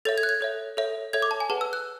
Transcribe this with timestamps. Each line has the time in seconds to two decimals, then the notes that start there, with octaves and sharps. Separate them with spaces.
0.05 A4 C#5 E5 A6
0.18 G#6
0.23 F#6
0.29 G#6
0.41 A4 C#5 E5
0.77 A4 C#5 E5
1.13 A4 C#5 E5 G#6
1.22 D6
1.31 A5
1.40 G#5
1.50 G#4 B4 F#5 A5
1.61 E6
1.73 F#6